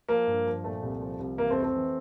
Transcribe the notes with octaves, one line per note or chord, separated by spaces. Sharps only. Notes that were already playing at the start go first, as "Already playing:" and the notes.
F3 A#3
G2
F3
A#2 A3
C2
F3
C2
E3 A#3
A3 C4
F2
A3 C4
E3